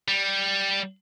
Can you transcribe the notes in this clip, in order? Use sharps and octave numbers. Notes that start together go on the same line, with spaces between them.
G3